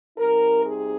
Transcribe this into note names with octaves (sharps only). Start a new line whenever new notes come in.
C3 G3 C4 D#4 A#4
G#4